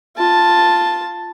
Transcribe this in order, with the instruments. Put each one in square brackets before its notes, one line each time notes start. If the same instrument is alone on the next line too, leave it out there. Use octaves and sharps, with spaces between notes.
[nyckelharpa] F4 A5